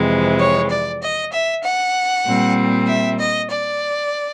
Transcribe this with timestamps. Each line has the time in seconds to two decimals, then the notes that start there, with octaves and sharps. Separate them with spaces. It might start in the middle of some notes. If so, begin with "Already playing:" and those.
Already playing: F2 C3 E3 G#3
0.39 C#5
0.70 D5
1.02 D#5
1.32 E5
1.63 F#5
2.26 A#2 G3 C4
2.87 E5
3.19 D#5
3.50 D5